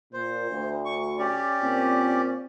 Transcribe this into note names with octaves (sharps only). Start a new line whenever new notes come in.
A#2 C5
D2
C#6
C#4 G4 D5
A#2 C4